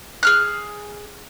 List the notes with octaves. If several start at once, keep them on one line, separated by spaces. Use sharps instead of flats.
G#4 F6 F#6